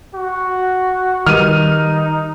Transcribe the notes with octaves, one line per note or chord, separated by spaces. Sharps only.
F#4
D#3 G3 D#4 G4 B4 F6 D#7